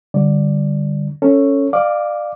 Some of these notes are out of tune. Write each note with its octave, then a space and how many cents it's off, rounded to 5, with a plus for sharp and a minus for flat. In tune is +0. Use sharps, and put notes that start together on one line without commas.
D3 +0 G3 +0 D5 +0
C#4 +0 A4 +15 C#5 +0
D5 +30 F5 +0 D6 +0